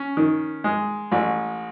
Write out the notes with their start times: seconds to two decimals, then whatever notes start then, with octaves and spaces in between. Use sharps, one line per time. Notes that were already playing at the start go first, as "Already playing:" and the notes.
Already playing: C#4
0.17 D#3
0.64 G#3
1.12 A1